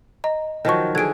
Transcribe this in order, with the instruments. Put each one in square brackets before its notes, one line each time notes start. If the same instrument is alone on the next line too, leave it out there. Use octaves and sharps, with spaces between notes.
[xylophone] D#5 A#5
[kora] D#3 F3 F#3 [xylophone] D#5 C#6
[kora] D3 G#4 [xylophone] G#6 D7